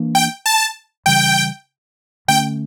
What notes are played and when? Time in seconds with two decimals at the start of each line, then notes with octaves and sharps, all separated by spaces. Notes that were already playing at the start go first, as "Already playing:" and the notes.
Already playing: E3 A#3 D4
0.15 G5
0.46 A5
1.06 C#3 E3 G3 G5
2.28 D3 A3 C#4 G5